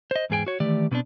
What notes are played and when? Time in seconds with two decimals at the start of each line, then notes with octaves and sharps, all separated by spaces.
0.11 C5 D#5
0.30 E2 G#2 G#4 G5 G#5
0.47 F#4 C#5
0.60 D#3 E3 A3 G4 D5
0.91 B2 B3 C4 D4